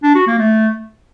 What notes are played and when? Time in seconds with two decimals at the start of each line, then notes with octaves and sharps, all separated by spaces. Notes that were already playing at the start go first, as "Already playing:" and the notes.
0.03 D4
0.15 F#4
0.27 A#3
0.39 A3